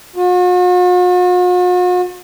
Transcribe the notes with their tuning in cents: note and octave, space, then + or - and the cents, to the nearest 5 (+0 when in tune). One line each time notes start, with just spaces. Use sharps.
F#4 -45